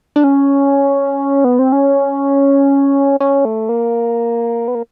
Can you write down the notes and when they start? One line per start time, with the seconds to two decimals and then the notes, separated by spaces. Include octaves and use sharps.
0.16 D4
0.24 C#4
1.44 B3
1.59 C4
1.72 C#4
3.20 C#4
3.45 A3
3.69 A#3
4.68 B3
4.75 A#3